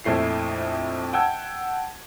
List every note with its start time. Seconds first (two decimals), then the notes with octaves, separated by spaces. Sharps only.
0.04 A#1 F2 A3 E4 C7
1.13 F#5 G5 A5 E6 G#6